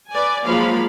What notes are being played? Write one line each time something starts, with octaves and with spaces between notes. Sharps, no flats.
B4 D5 G#5
F3 F#3 G#3 A#3 F5 B5